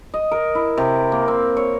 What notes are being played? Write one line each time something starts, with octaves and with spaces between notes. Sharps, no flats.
D#5
A#4
E4
C3
A#3
C4
C#5